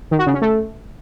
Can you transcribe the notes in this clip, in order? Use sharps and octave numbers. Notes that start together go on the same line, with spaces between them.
D#3
F#4
C#3
C#4
A3